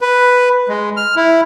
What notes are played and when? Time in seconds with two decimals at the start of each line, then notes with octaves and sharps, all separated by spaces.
0.01 B4
0.69 G#3
0.97 F6
1.16 E4